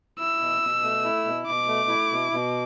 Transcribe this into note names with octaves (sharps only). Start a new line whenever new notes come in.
E4 E6
B2
B2
A3
E4
B2
B2 D6
A3
E4
B2
B2